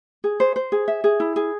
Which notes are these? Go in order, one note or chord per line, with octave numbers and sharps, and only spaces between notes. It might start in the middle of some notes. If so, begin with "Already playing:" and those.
G#4
C5
C5
G#4
E5
G#4
E4
G#4